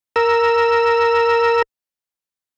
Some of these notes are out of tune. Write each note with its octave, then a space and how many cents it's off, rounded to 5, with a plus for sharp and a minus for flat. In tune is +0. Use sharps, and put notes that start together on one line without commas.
A#4 +0 E6 +0